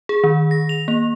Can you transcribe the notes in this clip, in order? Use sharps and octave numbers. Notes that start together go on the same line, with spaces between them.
G#4
D#3
A#6
F7
A#3